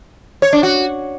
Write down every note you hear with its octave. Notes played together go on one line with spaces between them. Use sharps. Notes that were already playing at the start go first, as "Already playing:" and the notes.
C#5
D4
F#4